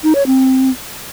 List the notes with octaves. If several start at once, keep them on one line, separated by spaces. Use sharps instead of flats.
D#4
C#5
C4